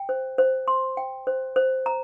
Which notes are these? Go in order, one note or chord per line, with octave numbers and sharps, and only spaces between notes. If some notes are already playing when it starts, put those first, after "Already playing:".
Already playing: G5
C5
C5
C6
G5
C5
C5
A#5